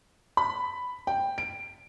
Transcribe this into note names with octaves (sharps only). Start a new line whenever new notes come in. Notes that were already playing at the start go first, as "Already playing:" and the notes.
B5
G5
D7